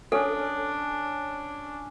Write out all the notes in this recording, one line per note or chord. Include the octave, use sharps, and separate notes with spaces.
C#4 D4 A4